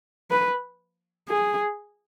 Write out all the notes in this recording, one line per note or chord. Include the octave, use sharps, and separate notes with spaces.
B4
G#4